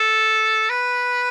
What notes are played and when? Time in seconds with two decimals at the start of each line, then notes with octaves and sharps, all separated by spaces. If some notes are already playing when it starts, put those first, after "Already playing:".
Already playing: A4
0.69 B4